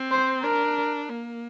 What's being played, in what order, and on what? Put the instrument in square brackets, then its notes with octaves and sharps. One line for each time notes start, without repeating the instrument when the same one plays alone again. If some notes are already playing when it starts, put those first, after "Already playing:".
Already playing: [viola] C4
[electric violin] C5
[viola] D4 [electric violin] A#4
[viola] A#3